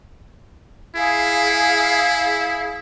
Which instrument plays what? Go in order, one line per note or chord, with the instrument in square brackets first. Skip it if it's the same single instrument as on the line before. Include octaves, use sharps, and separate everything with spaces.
[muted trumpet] E4 [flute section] G#4 F5